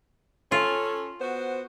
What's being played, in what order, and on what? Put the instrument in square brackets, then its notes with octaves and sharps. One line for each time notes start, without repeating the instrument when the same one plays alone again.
[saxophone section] C#4 A4 [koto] F4
[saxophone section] B3 F#4 C5